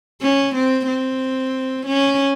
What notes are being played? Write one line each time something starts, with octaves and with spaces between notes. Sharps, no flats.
C#4
C4
C4
C#4